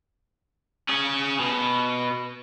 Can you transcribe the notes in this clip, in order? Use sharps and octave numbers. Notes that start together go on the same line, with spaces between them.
C#4 G#4
B2